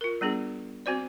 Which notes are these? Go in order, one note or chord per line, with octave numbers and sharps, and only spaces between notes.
F4 A#4
G3 B3 D4 G#4
C4 F#4 C5 D5